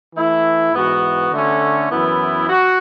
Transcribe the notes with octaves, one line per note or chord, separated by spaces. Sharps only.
E3 A3 E4
G#2 E3 B3 F#4
D3 A3 C#4
F#2 E3 B3 E4
F#4